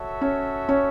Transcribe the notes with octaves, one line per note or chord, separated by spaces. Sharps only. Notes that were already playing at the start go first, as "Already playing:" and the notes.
Already playing: F#4 A4 C#5 E5
C#4
C#4